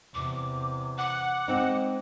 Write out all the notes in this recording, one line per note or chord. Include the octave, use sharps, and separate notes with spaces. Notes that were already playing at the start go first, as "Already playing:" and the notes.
E2 C3 D6
F#5 D6
G#3 C4 D#4